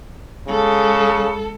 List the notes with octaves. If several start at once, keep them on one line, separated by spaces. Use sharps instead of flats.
C#3 G#3 A4